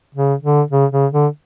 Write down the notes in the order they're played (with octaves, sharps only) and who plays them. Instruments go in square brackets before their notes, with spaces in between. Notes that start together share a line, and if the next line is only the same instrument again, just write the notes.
[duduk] C#3
D3
C#3
C#3
D3